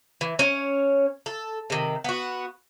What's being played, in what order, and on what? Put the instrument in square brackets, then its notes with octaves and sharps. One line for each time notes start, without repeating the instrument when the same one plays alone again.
[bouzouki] E3
C#4 C#5
A4
C3 D#3
B3 F#4